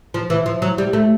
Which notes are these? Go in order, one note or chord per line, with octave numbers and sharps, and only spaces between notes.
F3
E3
F3
F#3
G3
A3